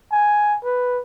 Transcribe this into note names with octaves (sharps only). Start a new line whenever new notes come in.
G#5
B4